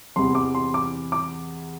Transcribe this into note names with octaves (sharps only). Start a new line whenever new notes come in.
E2 C3 E3 C6
D6
C6
D6
D6